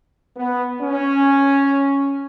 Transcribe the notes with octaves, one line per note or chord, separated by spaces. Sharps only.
B3
C#4